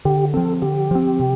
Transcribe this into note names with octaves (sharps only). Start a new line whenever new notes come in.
D3 G4
F3 C4 A4
D3 G4
F3 C4
C3